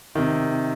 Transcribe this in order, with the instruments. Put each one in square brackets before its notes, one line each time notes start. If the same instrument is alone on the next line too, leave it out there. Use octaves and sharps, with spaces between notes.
[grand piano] C3 D#3